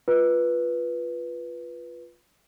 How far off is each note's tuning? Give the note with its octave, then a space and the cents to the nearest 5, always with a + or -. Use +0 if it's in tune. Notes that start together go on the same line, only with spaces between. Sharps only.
F4 +0 B4 -10